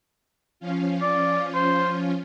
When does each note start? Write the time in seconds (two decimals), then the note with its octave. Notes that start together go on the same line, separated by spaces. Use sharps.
0.60 F3 C#4 F4
1.02 D5
1.55 C5